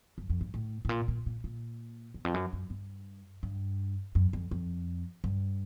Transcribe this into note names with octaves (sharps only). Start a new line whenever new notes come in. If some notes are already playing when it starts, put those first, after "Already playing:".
F#2
F2
G2
A2
A2
A#2
A#2
A#2
A#2
E2
F2
F#2
F#2
G2
G2
F#2
F2
F2
G2